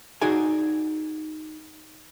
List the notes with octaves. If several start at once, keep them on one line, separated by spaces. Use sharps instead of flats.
D#4 F#4 G#4 D5 G#5